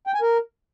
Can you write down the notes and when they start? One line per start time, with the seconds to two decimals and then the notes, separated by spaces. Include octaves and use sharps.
0.07 G5
0.14 G#5
0.21 A#4